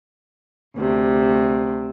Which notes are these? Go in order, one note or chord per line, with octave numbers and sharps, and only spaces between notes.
D2 C3